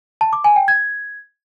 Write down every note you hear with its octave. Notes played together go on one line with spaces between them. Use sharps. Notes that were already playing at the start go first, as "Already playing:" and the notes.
A5
D6
G#5
G5
G#6